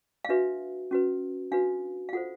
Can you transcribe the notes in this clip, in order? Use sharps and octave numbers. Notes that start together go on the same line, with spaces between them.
F5
D4 F#4 B4 E5
C#4 F#4 B4
D4 F#4 B4 F5
F5
F4 A4 C5 F#5